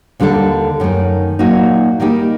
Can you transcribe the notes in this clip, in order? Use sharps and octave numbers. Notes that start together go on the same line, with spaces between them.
D#2 D3 G3 D4 A4
F#2 D#3 A3
A#2 F#3 A#3 D#4 F#4
D#3 G3 A#3 D#4 G4